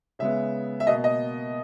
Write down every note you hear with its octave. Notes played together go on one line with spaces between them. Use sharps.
C#3 G#3 B3 E5
E5
B2 A#3 D#5
D#5